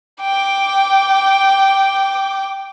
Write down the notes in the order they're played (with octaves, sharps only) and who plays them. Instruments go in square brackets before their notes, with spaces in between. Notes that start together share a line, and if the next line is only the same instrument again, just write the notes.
[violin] G5 D6